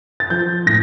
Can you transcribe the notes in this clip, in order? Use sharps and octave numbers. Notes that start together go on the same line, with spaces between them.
A6
F3 G6
A2 A#6